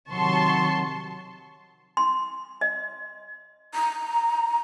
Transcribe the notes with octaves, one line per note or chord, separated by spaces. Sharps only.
C3 D#3 F#3 A5 C6 C#6
C6
D#5
A#5